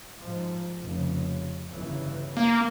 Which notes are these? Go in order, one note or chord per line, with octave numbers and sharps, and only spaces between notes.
G#2 F3
F1 C#3
G1 C#3 E3
A#3